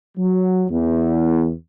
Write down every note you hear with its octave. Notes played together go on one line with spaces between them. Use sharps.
F#3
E2